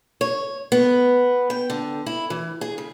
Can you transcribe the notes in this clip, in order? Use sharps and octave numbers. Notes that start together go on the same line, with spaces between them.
C#5
B3
G5
D3
E4
E3
G#4
C#3